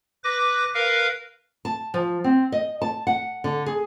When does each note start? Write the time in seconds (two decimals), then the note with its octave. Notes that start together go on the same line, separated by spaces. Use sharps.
0.24 B4 D6 A#6
0.74 A#4 B4 F5
1.65 A5
1.94 F3
2.24 C4
2.52 D#5
2.82 A5
3.07 F#5
3.44 D3
3.66 G#4